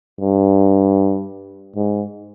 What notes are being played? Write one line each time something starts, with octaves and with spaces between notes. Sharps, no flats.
G2
G#2